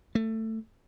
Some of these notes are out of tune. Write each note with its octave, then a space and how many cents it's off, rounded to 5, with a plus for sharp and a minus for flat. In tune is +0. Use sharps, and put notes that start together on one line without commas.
A3 +15